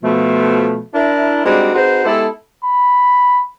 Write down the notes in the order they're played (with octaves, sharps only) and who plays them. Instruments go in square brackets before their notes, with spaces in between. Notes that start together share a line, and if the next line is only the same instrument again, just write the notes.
[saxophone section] B2 F3 A3
D4 E4 A#4
G3 G#3 C4 D4 D#4 F#4
C4 D#4 F#4 G#4 B4 C5
G#3 B3 E4 G4 A4
[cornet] B5